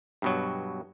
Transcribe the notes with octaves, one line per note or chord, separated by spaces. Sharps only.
G2 B2 F#3